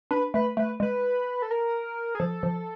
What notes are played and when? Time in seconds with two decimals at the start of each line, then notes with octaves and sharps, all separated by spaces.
0.11 D4 B4
0.34 A3 B4
0.57 A3 B4
0.80 G#3 B4
1.42 A4
1.51 A#4
2.15 G#4
2.20 F3 A4
2.43 F3